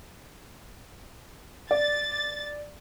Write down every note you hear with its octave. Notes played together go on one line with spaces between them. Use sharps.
D5 A6